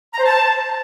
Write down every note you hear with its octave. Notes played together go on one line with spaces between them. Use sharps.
A#5
C5
A5